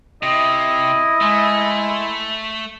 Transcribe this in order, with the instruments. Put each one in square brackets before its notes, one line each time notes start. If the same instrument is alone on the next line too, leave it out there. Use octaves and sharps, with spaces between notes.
[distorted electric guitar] C3 [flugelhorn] E4 [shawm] D#5
[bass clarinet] G#3 [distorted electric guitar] A3